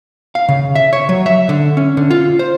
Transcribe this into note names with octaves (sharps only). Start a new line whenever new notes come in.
F5
C#3
E5
C#5
F#3
E5
D3
C#4
D3
F4
C5